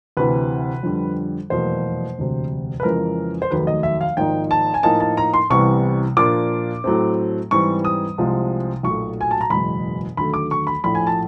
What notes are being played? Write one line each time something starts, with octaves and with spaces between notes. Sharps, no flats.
D2 C3 E3 B4
F2 D3 G3
F1 E2 B2 F#3 A#3 C5
E1 D2 C3
B4
F2 C#3 E3 G#3 A#4
C5
F1 D#2 D#3 F#3 A3 B4
D#5
E5
F5
G#1 G#2 F3 A#3 D#4 G5
A5
G#5
A2 F3 A#3 D#4 A5
A5
A#5
C6
C2 C3 E3 G3 B3 C#6
A#2 F3 A#3 D4 F4 D6
A2 F#3 A3 C4
G#2 E3 G3 C4 C#6
D#6
C2 C3 F3 G#3
B1 A#2 F#3 A3 C#6
G#5
A5
A#5
F#1 E2 B2 G#3 B5
D#2 D3 F#3 A3 B5
D6
C#6
B5
A#1 A2 F3 A3 B5
G#5
A5